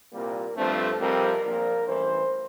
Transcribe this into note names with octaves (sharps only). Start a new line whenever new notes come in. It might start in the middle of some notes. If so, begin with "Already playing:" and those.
C2 A#2 G3 A#3 A#4
G2 F3 A3 C4 A4
F2 C3 G3 C4 A#4
A#1 A#2 F3 A#4
A1 G2 E3 C5